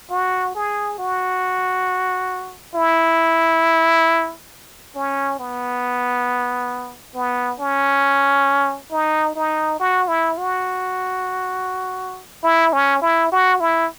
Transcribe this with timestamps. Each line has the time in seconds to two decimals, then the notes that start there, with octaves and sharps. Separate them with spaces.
0.10 F#4
0.55 G#4
0.99 F#4
2.75 E4
4.95 C#4
5.39 B3
7.15 B3
7.60 C#4
8.91 D#4
9.36 D#4
9.80 F#4
10.08 E4
10.38 F#4
12.43 E4
12.73 C#4
13.02 E4
13.32 F#4
13.60 E4